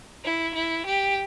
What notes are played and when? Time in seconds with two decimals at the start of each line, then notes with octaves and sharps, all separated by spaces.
0.24 E4
0.55 E4
0.86 G4